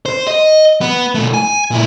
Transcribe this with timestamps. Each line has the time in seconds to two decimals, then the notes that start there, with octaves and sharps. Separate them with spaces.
0.06 C5
0.28 D#5
0.81 B3
1.15 B2 A3
1.34 G#5
1.71 A#2 E4